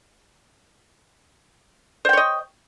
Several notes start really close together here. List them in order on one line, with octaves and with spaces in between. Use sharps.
C5 G5 C#5 D#5